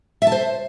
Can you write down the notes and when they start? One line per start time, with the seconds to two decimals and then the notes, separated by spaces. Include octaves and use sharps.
0.22 E5
0.27 A5
0.32 C5